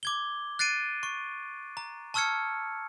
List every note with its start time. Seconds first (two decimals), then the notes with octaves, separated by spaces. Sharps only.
0.03 D6 G#6 G7
0.59 F#6 A6 C7 D7 D#7
1.03 C#6
1.77 A#5
2.14 A5 C#6 E6 F6 G#6 C#7